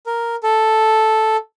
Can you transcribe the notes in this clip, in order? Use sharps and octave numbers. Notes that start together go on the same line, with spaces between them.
A#4
A4